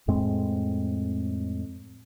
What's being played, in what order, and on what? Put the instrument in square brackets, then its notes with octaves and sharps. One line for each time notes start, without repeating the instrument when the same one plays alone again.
[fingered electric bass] F2 A2 G#3 C4